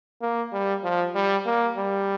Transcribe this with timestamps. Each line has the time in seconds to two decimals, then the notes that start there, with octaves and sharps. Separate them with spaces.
0.21 A#3
0.52 G3
0.84 F3
1.15 G3
1.46 A#3
1.77 G3